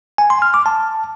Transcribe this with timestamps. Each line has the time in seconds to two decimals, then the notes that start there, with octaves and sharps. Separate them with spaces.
0.18 G#5
0.30 C6
0.42 F6
0.54 D6
0.66 A5